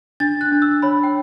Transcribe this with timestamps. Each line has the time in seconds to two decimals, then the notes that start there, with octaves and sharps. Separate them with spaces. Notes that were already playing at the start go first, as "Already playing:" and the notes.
0.20 D4 A6
0.41 F#6
0.52 D4
0.62 E6
0.82 C#5 B5
1.03 G5